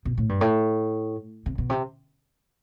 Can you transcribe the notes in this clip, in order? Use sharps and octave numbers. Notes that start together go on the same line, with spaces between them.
B2
A2
G2
A2
C3
B2
C3